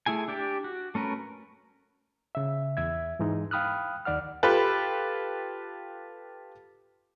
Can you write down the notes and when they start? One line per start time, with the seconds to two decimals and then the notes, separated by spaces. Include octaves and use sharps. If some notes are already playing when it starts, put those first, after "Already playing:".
0.06 A3 E4 G#4 G#5
0.28 D4 G4 D5
0.64 F#4
0.95 A3 C#4 A#4 B4
2.35 C#3 E5
2.77 E2 E5 G#6
3.19 G#2 E3 G#3 D#4
3.51 F5 G5 B5 D#6 F6 F#6
4.05 D#2 D#3 D5 F#5 F6
4.43 F4 G4 A4 B4